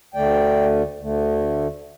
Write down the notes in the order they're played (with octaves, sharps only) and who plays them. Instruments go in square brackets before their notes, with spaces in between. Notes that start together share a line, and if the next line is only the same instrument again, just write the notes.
[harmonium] D2 D3 A3 D5 G5
D2 D3 A3